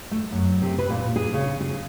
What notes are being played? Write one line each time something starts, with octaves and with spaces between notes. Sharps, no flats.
A3
F#2
C3
B4
A#2
G#4
C#3
G#4